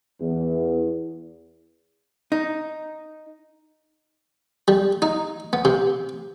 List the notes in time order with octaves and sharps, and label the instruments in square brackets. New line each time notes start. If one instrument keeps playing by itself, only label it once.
[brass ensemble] E2
[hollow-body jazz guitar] D#4
[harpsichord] G3
D#4
B3
C3